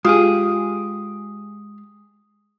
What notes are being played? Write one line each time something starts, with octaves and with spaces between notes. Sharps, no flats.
G#3 F4 G4 G#4 D#6